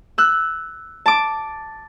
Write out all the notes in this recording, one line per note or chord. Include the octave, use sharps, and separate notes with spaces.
E6 F#6
A5 D6